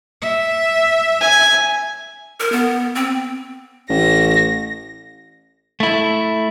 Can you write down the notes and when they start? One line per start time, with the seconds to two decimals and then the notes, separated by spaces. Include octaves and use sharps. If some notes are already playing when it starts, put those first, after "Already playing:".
0.22 E5
1.21 G#5
2.40 A#4
2.52 B3
2.95 C4
3.90 A1 A#6
5.80 A3 E4